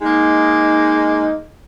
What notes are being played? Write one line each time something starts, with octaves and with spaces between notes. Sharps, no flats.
G#3 A#3 D#4